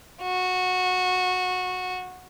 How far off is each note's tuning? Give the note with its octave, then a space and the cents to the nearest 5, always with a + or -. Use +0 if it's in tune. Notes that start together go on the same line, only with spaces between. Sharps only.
F#4 -15